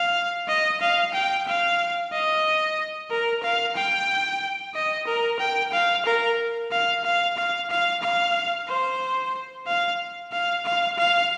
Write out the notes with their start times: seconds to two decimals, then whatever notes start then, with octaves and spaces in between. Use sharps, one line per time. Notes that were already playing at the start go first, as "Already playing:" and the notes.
Already playing: F5
0.48 D#5
0.81 F5
1.14 G5
1.47 F5
2.12 D#5
3.10 A#4
3.43 F5
3.76 G5
4.75 D#5
5.07 A#4
5.40 G5
5.73 F5
6.06 A#4
6.71 F5
7.04 F5
7.37 F5
7.70 F5
8.02 F5
8.68 C5
9.67 F5
10.32 F5
10.65 F5
10.98 F5